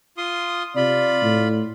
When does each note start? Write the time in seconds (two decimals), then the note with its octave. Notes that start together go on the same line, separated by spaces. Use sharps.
0.17 F4 C6 D#6
0.76 C3 F4 D5 B5
1.22 A2